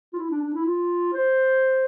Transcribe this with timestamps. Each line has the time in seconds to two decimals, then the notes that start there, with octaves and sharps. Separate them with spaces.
0.13 F4
0.18 E4
0.31 D4
0.42 D4
0.54 E4
0.66 F4
1.13 C5